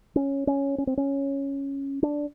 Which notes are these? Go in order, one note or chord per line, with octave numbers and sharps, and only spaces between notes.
C#4
C#4
C#4
C4
C#4
D4